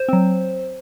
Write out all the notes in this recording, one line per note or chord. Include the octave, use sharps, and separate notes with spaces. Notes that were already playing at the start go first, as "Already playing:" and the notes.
Already playing: C5
F#3 C4